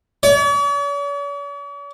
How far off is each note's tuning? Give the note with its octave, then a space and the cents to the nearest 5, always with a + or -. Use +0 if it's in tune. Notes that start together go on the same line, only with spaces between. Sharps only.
C#5 +45